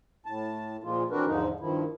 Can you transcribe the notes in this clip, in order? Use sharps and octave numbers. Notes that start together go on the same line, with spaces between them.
A2 A5
A#2 F3 G#3 A#3 F4
E3 C4 D4 F#4 A#4 B4
E2 G#2 D3 F3 D#4
G2 D#3 F3 E4